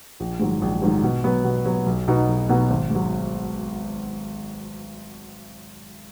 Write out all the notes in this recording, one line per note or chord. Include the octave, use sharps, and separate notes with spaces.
A#1
G#2 D#3 F#3
A#1
G#2 D#3 F#3
B2
F#3 B3
B2
F#3 B3
B1
B2 F#3 B3 D#4
B1
B2 F#3 B3 D#4
G#1
G#2 F#3